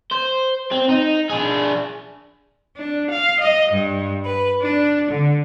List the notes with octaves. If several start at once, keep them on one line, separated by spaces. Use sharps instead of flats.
C5
C4
D#4
D4 G#4
D4
F5
D#5
G2
B4
D4
D3